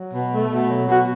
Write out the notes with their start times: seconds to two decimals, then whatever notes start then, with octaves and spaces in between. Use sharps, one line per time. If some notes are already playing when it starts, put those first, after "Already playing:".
Already playing: F#3
0.13 B2
0.32 A3
0.50 B2
0.69 F#3
0.88 B2 F#4